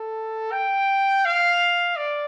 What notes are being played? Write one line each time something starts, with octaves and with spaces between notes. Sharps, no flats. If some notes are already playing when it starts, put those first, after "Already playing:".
Already playing: A4
G5
F5
D5